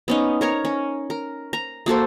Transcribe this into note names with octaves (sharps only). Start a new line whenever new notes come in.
B3 C#4 D#4
A#4 C#5 A#5
C#4
A#4
A#5
A#3 F#4 A4 C5